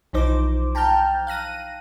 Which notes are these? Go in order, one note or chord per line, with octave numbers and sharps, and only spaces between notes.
B1 E3 F3 D#4 C5 D6
G5 A5 A#5 F6 G6
F5 F#6 A#6 D#7